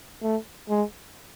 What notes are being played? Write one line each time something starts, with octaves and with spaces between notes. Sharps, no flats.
A3
G#3